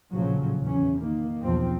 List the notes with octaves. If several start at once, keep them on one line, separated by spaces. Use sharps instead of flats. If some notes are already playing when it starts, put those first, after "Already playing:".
A#1 A2 C#3 F3 F#3
E2 E3 C#4
D#3 A#3
B1 E2 F3 C4